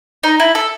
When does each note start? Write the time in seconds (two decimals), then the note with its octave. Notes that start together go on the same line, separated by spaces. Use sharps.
0.23 D#4
0.40 E4
0.55 A4